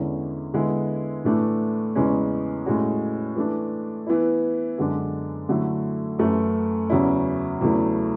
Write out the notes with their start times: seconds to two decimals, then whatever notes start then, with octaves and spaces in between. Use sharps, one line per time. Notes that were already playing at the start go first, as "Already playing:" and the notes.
Already playing: E2 D3 G#3 C#4 E4
0.54 D3 G#3 B3 E4
1.24 A2 E3 A3 D4
1.95 E2 C#3 E3 G#3 C#4
2.66 A2 G#3 C#4 F#4
3.36 E3 A3 D4
4.07 E3 B3 E4
4.78 F#2 D3 G#3 D4
5.49 D3 F#3 A3 E4
6.19 F#2 E3 A3 E4
6.90 E2 C#3 F#3 C#4 E4
7.61 E2 C#3 F#3 A3 E4